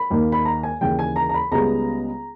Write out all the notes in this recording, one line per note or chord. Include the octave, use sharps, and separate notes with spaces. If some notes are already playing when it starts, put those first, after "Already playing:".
Already playing: B5
D#2 D#3 A#3
B5
A#5
G#5
D#2 C#3 E3 G5
G#5
A#5
A#5
B5
C#2 C#3 G3 B3 A#5